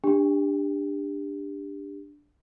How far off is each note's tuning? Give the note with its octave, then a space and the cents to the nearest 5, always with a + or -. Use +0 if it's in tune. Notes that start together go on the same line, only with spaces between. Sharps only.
D4 +0 G4 +25